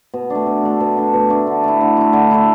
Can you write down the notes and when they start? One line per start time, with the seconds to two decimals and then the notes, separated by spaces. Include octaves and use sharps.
0.14 B2
0.30 A3 D4
0.46 B2
0.63 A3 D4
0.80 B2
0.97 A3 D4
1.13 B2
1.30 A3 D4
1.47 D3
1.64 A3 E4
1.81 D3
1.97 A3 E4
2.13 D3
2.31 A3 E4